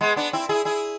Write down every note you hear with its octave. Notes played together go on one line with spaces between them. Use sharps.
G#3 B3
B3 D4
C4 E4
E4 G#4
E4 G#4